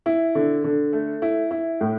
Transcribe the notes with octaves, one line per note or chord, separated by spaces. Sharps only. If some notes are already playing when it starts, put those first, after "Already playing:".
E4
D3
D3
A3
E4
E4
A2